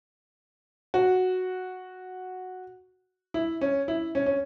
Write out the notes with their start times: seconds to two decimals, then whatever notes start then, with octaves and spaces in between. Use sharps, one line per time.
0.94 F#4
3.34 E4
3.61 C#4
3.88 E4
4.15 C#4
4.26 C#4